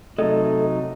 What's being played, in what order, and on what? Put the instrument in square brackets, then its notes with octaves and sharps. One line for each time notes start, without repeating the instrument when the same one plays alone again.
[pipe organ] C3 F#3 D#4 [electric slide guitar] A3 A4 D#5